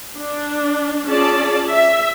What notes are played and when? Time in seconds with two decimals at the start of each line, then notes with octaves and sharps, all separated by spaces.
0.18 D4
1.08 C#4 F4 G#4 D5 A5
1.69 E5